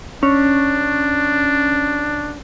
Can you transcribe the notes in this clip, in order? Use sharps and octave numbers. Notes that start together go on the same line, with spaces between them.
C#4 D4